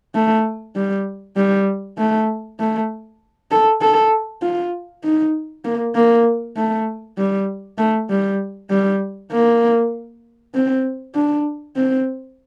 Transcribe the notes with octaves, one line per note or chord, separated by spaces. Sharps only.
A3
G3
G3
A3
A3
A4
A4
F4
D#4
A#3
A#3
A3
G3
A3
G3
G3
A#3
C4
D4
C4